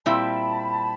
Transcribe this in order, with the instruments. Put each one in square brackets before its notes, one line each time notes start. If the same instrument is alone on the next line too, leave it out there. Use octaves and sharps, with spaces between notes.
[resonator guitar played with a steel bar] A#2 G3 C4 E4 [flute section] A5 B5